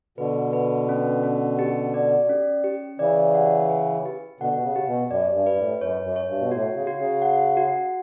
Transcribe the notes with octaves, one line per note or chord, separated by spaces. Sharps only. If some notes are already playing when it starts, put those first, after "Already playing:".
B2 D3 B4
B4
C#4
C#4
G4
D5
C#4
G4
C#3 E3 D5
F#5
B4
G4
B2 D3 F#5
B2
C#3
G4
B2
F#2 D5
G2
B4
G2
A2
F#2 C#5
F#2
C#5
G2
B2
A2 F#4
C#3
F#4
C#3
F#5
F#4